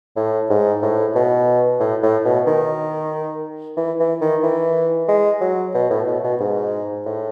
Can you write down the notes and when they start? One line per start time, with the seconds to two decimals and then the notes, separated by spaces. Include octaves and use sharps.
0.16 A2
0.50 G#2
0.82 A2
1.15 B2
1.80 A2
2.03 A2
2.25 B2
2.47 D#3
3.77 E3
4.00 E3
4.21 D#3
4.43 E3
5.08 G#3
5.41 F#3
5.75 B2
5.90 A2
6.07 B2
6.24 B2
6.40 G#2
7.06 A2